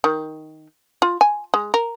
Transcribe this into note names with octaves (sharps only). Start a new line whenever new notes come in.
D#3
F4
G#5
G#3
A#4